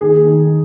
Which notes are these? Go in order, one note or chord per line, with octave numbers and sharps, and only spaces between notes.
D#2 G#4
D#3